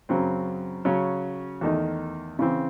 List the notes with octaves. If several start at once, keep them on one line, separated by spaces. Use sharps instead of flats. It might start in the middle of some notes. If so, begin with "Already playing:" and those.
F#2 C#3 F#3 C4
C#3 F#3 C#4
E2 D#3 A3 D#4
C#3 E3 C4